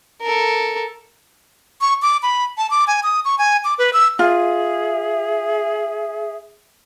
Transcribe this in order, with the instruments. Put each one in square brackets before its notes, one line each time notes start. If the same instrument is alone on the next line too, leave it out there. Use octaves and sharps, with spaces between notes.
[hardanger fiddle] A4 A#4
[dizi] C#6
D6
B5
A5
D6
G#5
D#6
C#6
G#5
D6
B4
E6
[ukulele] F4 [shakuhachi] G#4 [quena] E5